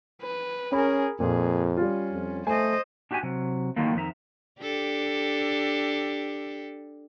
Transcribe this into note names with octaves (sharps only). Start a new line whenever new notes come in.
B4
C#4 G#4 A#4 B5
F2 A#2 G#4
G3 C#4 F4
F2
A3 C5 D#5 G#5
D4 F#4 G4 D5 G#5
C3 F#3
D3 D#3 F#3 A3 A#3
F2 D#3 D#4 E5 A#5
D4 G4 A4